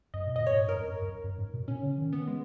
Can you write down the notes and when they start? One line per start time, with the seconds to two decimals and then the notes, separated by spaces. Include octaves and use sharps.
0.14 F#2 D#5
0.27 B2
0.36 A#2 D#5
0.47 C#5
0.53 G#2
0.67 F#2 A#4
0.79 F2
1.02 F#2
1.24 F#2
1.38 G#2
1.53 B2
1.68 A#2 C#4
1.83 C#3
1.98 D#3
2.13 B3
2.27 G#3